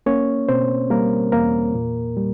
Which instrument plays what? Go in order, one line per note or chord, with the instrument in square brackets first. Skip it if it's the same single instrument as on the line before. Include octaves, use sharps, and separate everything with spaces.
[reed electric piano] A#3 C#4 C#5
B2 C4 C5
G3 A#3 A#4
E2 A#3 A#4
A#2
G3